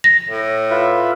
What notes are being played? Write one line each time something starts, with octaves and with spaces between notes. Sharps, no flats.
A#6
A2
F4 B4 E5